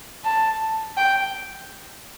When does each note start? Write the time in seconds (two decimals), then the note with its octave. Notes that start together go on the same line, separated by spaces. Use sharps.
0.24 A5
0.97 G5